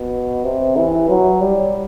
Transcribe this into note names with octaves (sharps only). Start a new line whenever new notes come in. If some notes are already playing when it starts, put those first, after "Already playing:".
Already playing: B2
C3
E3
F#3
G3